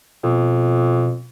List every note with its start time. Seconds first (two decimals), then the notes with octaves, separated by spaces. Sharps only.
0.23 F2 B2